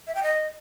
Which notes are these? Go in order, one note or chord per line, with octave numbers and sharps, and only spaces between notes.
E5
G5
D#5